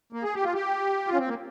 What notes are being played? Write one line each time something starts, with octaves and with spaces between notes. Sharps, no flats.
A#3
G#4
G4
F4
G4
F4
C#4
C4
A#3